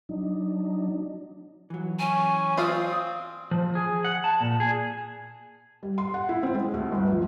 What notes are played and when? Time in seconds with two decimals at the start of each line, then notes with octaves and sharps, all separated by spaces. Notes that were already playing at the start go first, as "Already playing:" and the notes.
0.09 F#3 D4 D#4
1.70 E3 F#3
1.99 C#4 G#5
2.58 C4 F4 D5 F5 D#6
3.51 F3
3.75 G#4
4.05 F#5
4.24 A5
4.41 A#2
4.60 G#4
5.83 G3
5.98 C6
6.14 F#5
6.29 E4
6.43 C4
6.55 G#3
6.74 D2
6.92 G1
7.12 F3